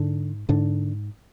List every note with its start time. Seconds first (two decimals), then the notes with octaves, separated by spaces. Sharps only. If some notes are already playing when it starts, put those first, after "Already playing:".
Already playing: G#2 D3 D4
0.49 G#2 D3 D4